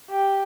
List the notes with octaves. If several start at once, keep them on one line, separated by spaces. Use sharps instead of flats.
G4